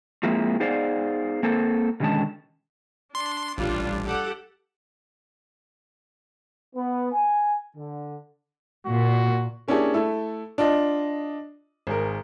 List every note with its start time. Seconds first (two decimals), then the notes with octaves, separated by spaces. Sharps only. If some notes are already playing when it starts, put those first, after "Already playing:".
0.23 F3 G#3 A#3 C4 E4
0.60 B3 D#4 G#4 C5 D5 F5
1.43 A#3 C4 A4 C5
2.00 B2 D3 D#3 G#3 C#4 A5
3.15 D4 C6
3.58 A1 G3 D4 F4
4.04 G4 A4 F#5
6.75 B3
7.12 G#5
7.76 D3
8.87 A#2 F#4
9.68 A#3 C#4 D4 E4 G4 G#4
9.94 A3 E4 A4
10.58 D4 F4 D#5
11.87 G#1 G#4 A#4